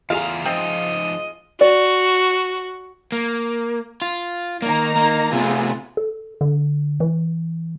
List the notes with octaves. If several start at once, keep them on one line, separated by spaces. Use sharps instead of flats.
E2 A3 F4 G#4 F5 A#5
F3 C4 D#4 D#5
F#4 D5
A#3
F4
D#3 A#3 D#4 A#5
A#3
C3 A3 B3 F4 G#4
A4
D3
E3